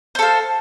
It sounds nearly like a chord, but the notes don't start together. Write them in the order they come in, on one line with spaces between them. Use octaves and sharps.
C5 A4 F5